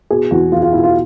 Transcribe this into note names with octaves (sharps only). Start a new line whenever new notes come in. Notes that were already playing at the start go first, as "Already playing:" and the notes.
B2 G#4
E2 F#4
E2 F4
F4
B2 E4
F4